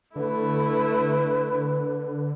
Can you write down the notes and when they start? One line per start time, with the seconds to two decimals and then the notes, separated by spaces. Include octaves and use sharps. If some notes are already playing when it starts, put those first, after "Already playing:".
0.16 D3 A3 E4 B4